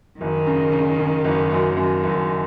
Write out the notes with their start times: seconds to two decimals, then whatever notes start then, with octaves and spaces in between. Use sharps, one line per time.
0.20 F#1 D#3
0.46 C#3
0.72 C#3
0.98 C#3
1.24 F#1
1.50 F#2
1.76 F#2 D#3
2.04 F#1